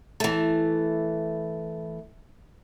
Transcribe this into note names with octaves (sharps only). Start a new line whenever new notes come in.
E3 A3